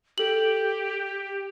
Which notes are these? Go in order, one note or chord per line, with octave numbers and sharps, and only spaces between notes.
G4 A4 F#7